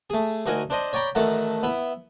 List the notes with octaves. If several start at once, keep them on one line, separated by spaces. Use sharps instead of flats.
A3 G#4
D2 D#4 F#4 A#4 G#5
D4 C5 D#5
C#5 D5 G5 A#5 B5
A1 D#3 A3 A4 F#5 A#5
B3 E4